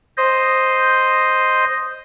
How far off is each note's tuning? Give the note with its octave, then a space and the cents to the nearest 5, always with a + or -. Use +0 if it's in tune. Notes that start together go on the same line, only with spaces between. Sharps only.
C5 +0 D#5 +0